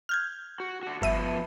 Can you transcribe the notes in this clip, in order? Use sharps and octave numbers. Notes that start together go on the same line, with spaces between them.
F6 G6 G#6
F#4
D4 F#4
G1 F3 B3 E5 A5 D#7